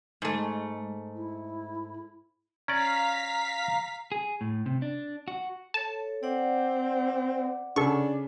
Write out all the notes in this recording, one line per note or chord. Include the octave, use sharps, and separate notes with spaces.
G#2 G#3 A3
E4
C#4 D5 F5 A#5 B6
G#4
A2
C3
D4
F#4
A4 C#5 A5
C4 D5 F#5 D6
C#3 D4 A4 C#6